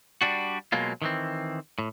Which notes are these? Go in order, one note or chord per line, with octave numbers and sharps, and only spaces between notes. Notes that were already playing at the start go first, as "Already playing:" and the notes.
G3 D4 F#4
B2 F#3 G#3 A#3 F4
D#3 E3 C4
A2